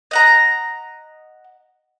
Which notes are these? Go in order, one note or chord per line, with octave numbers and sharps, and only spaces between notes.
D#5 F#5 A#5